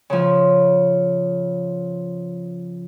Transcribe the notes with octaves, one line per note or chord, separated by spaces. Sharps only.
C#3 F3